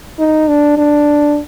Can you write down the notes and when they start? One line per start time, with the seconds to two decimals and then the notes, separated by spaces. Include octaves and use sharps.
0.19 D#4
0.48 D4
0.77 D4